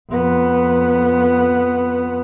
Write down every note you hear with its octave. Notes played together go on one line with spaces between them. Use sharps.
F2 B3